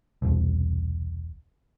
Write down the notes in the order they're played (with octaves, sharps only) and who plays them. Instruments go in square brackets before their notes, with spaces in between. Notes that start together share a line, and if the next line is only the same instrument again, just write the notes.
[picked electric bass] E1 C2